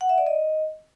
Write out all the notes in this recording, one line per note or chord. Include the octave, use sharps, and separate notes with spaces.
F#5
E5
D5
D#5